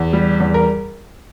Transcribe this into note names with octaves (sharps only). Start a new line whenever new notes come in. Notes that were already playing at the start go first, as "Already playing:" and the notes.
Already playing: E2
G3
E2
A#4